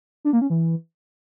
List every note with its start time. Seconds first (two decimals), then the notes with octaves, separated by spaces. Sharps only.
0.25 D4
0.33 A#3
0.41 C#4
0.50 E3